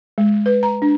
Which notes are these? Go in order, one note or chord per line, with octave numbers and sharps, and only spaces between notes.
G#3
B4
A#5
D4